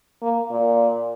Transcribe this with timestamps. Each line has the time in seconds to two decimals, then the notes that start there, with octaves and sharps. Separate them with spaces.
0.22 A#3
0.51 A#2